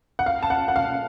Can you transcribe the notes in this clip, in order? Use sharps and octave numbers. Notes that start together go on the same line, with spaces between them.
F#5
F5
A5
F#5
F#5
F5